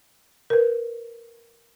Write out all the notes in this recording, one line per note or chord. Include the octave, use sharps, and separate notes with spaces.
A#4 B4